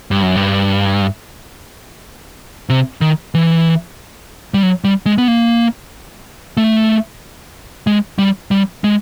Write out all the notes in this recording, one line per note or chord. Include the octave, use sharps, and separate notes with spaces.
G2
F#2
G2
C3
D#3
E3
G3
F#3
G3
G#3
B3
A#3
A3
G#3
G3
G3
G#3